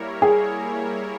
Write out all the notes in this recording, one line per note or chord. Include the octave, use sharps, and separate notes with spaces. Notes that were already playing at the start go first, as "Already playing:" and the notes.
Already playing: G3 A#3 E4 A#4 C#5
G#4